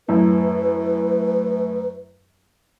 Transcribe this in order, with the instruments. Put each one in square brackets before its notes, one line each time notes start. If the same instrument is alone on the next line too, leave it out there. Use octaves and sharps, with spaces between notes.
[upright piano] F#2 A2 [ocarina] B4